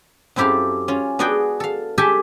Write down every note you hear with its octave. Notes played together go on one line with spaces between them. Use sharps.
F#2 C4 E4 G4 A4 F5
C#4 F4
B3 D4 F#4 G#4 D5 G5
A4 F5
G4 A4 E5 G5 G#5